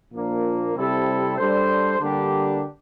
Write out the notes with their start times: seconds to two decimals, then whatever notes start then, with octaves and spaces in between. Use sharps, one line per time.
0.12 A#2 F3 A#3 D4
0.74 C3 G3 C4 E4 A4
1.37 G3 D4 A4 C5
2.00 D3 G3 A#3 D4 G4